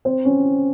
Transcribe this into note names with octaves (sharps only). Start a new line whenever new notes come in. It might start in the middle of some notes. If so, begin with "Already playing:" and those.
C4
C#4